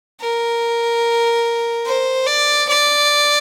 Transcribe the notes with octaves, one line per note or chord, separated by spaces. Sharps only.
A#4
C5
D5
D5